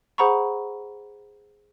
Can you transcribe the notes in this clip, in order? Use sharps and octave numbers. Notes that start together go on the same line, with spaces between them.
G#4 C5 F#5 A#5 B5 C#6